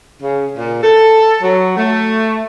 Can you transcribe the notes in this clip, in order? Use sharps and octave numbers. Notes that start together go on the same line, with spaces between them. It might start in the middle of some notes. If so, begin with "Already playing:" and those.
C#3
A#2
A4
F#3
A3